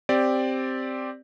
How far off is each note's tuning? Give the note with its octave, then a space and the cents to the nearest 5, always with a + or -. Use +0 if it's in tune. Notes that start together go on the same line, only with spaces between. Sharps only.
C4 +0 G4 +0 D5 +0